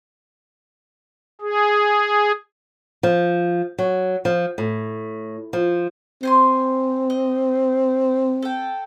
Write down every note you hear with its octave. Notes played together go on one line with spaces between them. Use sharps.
G#4
F3
F#3
F3
A2
F3
C4 C5 G#5 C6
D#5
A4 G5